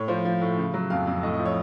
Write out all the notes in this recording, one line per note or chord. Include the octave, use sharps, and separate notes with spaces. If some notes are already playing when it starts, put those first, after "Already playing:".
Already playing: A2 C#5
F3 C5
F3
A2
C#3
F#3
F2 F5
F2
A2 D#5
D#5
F3
C#5